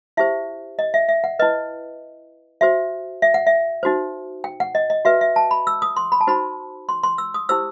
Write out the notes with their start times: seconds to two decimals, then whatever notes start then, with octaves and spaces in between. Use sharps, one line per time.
0.17 E4 G4 C5 E5
0.79 D#5
0.94 E5
1.09 E5
1.24 F#5
1.39 E4 B4 D#5
2.61 F#4 C5 E5
3.22 E5
3.34 F#5
3.47 E5
3.83 D#4 F#4 C5
4.44 G5
4.60 F#5
4.75 D#5
4.90 D#5
5.05 F#4 B4 E5
5.21 E5
5.36 A5
5.51 B5
5.67 E6
5.82 D#6
5.97 C6
6.12 B5
6.21 A5
6.27 D#4 F#4 C5 B5
6.89 C6
7.03 C6
7.18 E6
7.34 D#6
7.49 E4 G4 C5 E6